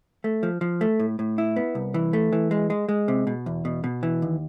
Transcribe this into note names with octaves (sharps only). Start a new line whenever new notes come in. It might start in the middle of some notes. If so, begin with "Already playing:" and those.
A3
F3
F3
A3
A2
A2
E4
B3
C2
E3
A3
E3
G#3
G#3
G#3
C3
B2
E2
B2
B2
E3
D#2